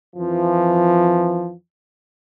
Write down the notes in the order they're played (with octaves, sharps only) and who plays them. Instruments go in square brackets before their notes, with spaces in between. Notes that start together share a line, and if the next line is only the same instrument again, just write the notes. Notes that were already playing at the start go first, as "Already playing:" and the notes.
[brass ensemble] F2 E3 F3